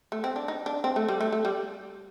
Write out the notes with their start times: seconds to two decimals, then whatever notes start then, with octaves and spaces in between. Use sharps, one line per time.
0.12 A3
0.24 C4
0.36 D4
0.48 D#4
0.66 D4
0.84 C4
0.96 A3
1.08 G3
1.21 A3
1.32 A3
1.45 G3